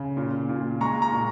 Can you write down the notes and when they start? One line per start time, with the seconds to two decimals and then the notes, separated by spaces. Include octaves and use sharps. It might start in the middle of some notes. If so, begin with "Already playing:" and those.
Already playing: C#3
0.17 A#2
0.49 A#2
0.81 G#3 A#5 C#6
1.02 A#5 C#6
1.12 A#2